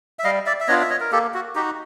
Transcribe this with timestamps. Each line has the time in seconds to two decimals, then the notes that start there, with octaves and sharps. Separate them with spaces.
0.19 E5
0.24 G3 D#5 F5
0.46 D5 E5
0.60 E5
0.68 B3 D4 F4 C#5 D#5
0.81 E5
0.90 C#5 D#5
1.00 A#4
1.12 A#3 G4 A4
1.34 F#4
1.55 D#4 F#4 G4